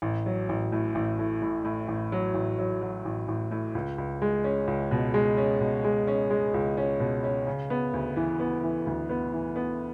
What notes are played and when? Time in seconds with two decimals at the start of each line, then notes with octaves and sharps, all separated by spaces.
0.02 A1
0.26 F#3
0.49 A1
0.72 A2
0.95 A1
1.19 A2
1.42 A2
1.65 A2
1.88 A1
2.12 F#3
2.34 A1
2.59 F#3
2.81 F#3
3.05 A1
3.28 A1
3.51 A2
3.75 C#2
3.98 C#2
4.22 G#3
4.44 C#4
4.67 C#2
4.91 B2
5.14 G#3
5.37 C#4
5.60 B2
5.84 G#3
6.07 C#4
6.30 G#3
6.54 C#2
6.77 C#4
7.00 B2
7.24 C#4
7.47 C#3
7.70 B3
7.93 D2
8.16 E3
8.40 B3
8.63 E3
8.86 D2
9.10 B3
9.33 E3
9.56 B3